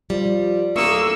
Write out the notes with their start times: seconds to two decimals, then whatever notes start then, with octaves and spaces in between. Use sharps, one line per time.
0.10 F3 G3
0.76 D1 A3 A#3 E4 C#6 D#6 E6